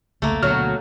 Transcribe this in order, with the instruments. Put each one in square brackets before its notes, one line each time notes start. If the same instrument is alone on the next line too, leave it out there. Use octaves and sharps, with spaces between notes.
[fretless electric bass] F1 C#2 [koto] A3 A#3
[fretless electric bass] D2 B2 [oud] F#3 [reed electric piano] F6